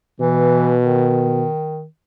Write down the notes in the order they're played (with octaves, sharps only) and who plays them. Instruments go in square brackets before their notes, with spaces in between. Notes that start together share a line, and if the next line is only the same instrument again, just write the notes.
[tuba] B2 [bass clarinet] E3
[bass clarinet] D#3